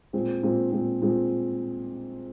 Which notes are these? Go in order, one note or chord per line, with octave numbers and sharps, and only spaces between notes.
A#2 G#3 C4
A#2 G#3 C4
A#2 G#3 C4
A#2 G#3 C4